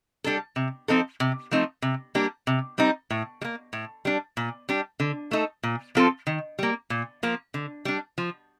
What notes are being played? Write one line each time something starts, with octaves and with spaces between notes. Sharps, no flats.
G3 D4 A4
C3
F3 C4 D#4 A4
C3
F3 A3 C4 D#4
C3
G3 A#3 D4 G4
C3
G3 C4 D#4
A2
G3
A#3
A2
G3 D4
A#2
G3 D4 G4
D3
A3 D#4 A4
A#2
F3 C4 F4 A4
D#3
G3 A#3
A#2
F3 A#3
D3
G3 D4
F3